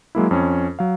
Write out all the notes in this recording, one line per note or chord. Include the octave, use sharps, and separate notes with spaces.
F#3 G#3 A#3 E4
F2 C#4
F#3 F5